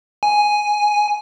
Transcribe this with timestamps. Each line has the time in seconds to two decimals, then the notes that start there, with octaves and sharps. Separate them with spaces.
0.23 G#5